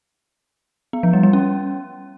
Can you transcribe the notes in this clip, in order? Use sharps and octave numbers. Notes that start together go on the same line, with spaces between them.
B3
F3
G3
G3
C#4